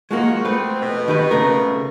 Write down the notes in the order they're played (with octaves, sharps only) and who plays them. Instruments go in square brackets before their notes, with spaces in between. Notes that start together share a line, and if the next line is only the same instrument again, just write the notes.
[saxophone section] D#3 F3 F#4 [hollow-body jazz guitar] G#3 A#3
[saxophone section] B2 B3 C4 [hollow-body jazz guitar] A3 B4
[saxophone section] F2 G#2 B2
[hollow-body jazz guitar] D#3 G4 B4
C#3 A3 A#4